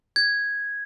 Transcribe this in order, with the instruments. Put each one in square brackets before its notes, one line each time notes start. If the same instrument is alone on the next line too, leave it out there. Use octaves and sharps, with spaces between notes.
[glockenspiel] G#6